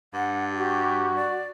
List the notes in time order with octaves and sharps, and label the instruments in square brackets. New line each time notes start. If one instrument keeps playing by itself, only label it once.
[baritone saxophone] G2 [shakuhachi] F#5
[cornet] F#4 [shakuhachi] G4
[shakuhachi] D5